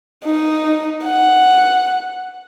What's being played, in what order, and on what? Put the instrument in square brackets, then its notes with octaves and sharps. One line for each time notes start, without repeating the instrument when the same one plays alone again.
[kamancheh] D#4
F#5